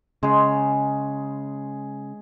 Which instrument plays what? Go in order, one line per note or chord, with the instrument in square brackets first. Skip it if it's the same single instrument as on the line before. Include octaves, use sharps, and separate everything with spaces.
[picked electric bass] C#3 [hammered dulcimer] G#3 G#4